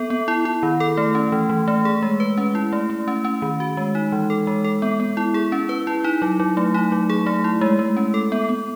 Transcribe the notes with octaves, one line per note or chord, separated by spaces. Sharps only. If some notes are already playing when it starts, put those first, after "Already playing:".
Already playing: B3 A4
B3
E4
E4
D#3
A4
A3
C#4
E3
E3
A3
G#4
G#3
B4
C#4
E4
A3
A3
C#4
C#4
D#3
F#4
G#3
D#4
E3
A4
G#3
A4
B3
B3
E4
G#4
C#4
B4
E4
D#4
F#3
F#3
A3
D#4
F#3
G#4
A3
E4
G#3
G#3
C#4
A4
B3
B3